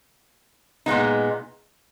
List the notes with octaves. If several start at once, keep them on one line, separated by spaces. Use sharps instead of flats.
A#2 G#3 B3 D#4